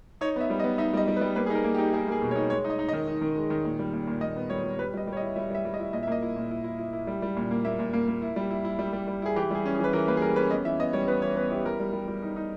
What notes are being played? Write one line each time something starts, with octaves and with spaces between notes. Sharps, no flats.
D#4 C#5
B3 E5
G3
D#5
B3
D#4 E5
G3 D#5
G3
B4
G3
A#3 B4
G#4
D#4 A#4
A#3
G4
D#4
D#4 G#4
A#3 G#4
B2
C#5
D#4
G#3 C#5
D#4
D#5
D#4
D#5
D#3
D#4
D#3
G#3
D#3
A#2
G3
A#2
A#2
A#2 D#5
B3
G3 C#5
G3
G3 B4
G3 D#5
G3
C#5
D#5
E4
G3 E5
G3 E5
G3
D#5
E4
A#2 D#5
E5
A#3 D#5
E4
A#2
E4
E4
E4
E4
G3
G3
A#2
A#3
A#3 E5
A#2
A#3
A#3
E4
G3
E4
E4
G3
G3
G3
E4 G#4
E3 G4
G3 G#4
C#4
G#4
E3 B4
E3 A#4
A#3 B4
G#4
G3 A#4
C#4 B4
B3 D#5
E3 E5
B3 D#5
G3 C#5
B3 B4
E3 C#5
B3 B4
E4 G4
G3 A#4
G3
G3
G3
D#4
D#4